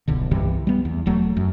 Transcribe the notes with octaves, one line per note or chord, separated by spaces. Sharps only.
D1 B1 D3
C2 G2 C3 E3
G3 B3
E2
E1 F#3 A3
F#2